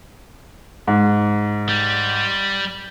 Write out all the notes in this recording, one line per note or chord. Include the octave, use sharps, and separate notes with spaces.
G#2
G3